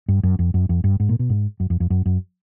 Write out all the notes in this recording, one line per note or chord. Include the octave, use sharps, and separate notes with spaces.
G2
F#2
F2
F#2
F2
G2
G#2
A#2
B2
G#2
F#2
F2
F2
F#2
F#2